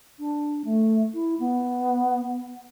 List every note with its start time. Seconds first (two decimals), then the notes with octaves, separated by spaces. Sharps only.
0.19 D4
0.65 A3
1.14 E4
1.40 B3